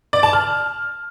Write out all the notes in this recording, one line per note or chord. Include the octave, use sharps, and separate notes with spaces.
D5
A5
F6